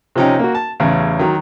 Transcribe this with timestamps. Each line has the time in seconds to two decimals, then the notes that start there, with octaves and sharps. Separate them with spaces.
0.16 C3 F3 C#4 D#4 G5
0.39 A#3 F#4
0.55 A5
0.80 A1 E2 C#3
1.19 D#3 F#3